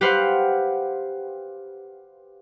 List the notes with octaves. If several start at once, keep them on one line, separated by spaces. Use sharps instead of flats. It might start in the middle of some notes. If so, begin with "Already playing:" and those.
G4 B4 C5 F5 F#5